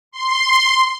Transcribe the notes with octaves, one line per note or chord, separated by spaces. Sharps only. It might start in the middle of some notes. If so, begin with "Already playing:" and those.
C6